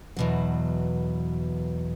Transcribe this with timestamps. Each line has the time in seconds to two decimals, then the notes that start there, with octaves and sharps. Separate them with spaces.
0.17 E2 B2 F#3